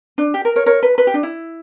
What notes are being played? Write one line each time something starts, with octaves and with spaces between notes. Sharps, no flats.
D4
G4
A#4
A#4 C#5
A#4 C#5
B4
B4
G4
D4
E4